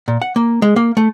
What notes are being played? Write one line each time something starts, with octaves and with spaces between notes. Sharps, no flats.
A#2
F#5
A#3
G#3
A#3
A3